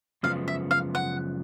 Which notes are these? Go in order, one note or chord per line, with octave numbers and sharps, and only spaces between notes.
F#2 C#3 F3 G#3 B3 F5
E5
F5
F#5